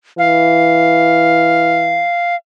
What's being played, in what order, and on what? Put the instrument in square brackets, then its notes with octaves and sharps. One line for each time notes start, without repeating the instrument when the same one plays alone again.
[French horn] E3 [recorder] F5